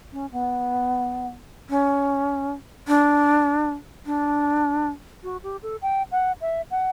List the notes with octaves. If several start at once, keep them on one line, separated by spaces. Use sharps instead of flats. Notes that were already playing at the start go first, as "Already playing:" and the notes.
C#4
B3
C#4
D4
D4
F#4
G4
A4
G5
F#5
E5
F#5